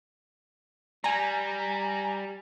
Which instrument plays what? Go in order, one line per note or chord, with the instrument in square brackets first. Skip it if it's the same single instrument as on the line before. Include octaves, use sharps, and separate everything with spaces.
[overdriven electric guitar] G3 [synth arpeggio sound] G#5 A#5